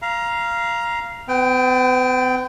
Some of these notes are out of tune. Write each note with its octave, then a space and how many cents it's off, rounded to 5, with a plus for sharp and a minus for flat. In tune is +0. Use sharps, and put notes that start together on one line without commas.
F5 -10 A#5 +20
B3 +45 G5 +0